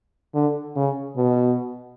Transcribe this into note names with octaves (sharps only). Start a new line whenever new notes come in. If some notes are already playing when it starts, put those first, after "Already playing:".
D3
C#3
B2